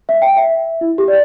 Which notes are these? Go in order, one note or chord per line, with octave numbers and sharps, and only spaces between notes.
E5
G5
E5
E4
G4
D5